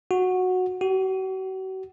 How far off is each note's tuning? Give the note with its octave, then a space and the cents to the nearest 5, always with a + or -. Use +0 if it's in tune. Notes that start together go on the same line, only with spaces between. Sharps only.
F#4 -10
F#4 +40